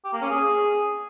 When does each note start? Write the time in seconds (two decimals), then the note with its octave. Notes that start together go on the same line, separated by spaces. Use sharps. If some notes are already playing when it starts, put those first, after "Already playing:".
0.04 G4
0.13 A#3
0.22 C#4
0.30 G#4